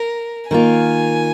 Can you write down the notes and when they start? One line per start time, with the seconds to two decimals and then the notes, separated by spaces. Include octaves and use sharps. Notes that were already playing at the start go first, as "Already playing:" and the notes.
Already playing: A#4
0.51 D#3 A#3 F4 G#5